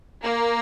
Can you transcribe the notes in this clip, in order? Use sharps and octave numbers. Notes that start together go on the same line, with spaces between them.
A#3